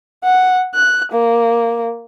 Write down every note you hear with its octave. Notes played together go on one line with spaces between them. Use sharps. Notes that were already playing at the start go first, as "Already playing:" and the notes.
F#5
F#6
A#3